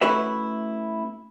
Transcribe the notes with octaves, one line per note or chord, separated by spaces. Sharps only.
A3 C#4 E4 F#4 B4 E5